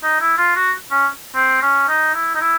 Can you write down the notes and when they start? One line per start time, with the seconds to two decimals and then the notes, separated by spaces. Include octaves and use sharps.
0.03 D#4
0.21 E4
0.38 F4
0.56 F#4
0.91 C#4
1.35 C4
1.62 C#4
1.88 D#4
2.14 E4
2.35 D#4
2.41 E4